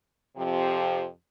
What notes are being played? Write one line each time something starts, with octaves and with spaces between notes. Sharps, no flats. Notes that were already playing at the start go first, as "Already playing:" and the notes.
F2 C3 F3 C4 G4